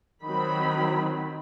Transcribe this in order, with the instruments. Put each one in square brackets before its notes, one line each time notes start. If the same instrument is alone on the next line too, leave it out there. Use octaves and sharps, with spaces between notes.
[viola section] D#3 F#3 C4 B5